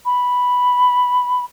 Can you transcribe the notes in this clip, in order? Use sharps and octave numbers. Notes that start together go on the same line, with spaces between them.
B5